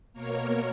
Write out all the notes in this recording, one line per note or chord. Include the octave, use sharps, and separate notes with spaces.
B2 A#3 A#4 C#5
C#5